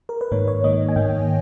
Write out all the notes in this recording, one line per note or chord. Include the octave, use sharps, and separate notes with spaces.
A#4
B4
G#2 D#3 A#3 C#5
C#5
G#2 D#3 A#3 D#5
G#5
G#2 D#3 A#3 G5